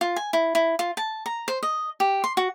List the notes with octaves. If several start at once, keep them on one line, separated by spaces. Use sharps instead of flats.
F4
G#5
E4
E4
F4
A5
A#5
C5
D#5
G4
C6
F#4